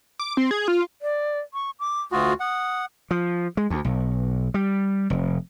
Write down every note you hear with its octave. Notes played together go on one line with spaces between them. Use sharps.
D6
C4
G#4
F4
D5
C#6
D6
D2 F4 F#4 D#6
F#5 D#6
F3
G#3
D2
B1
G3
F1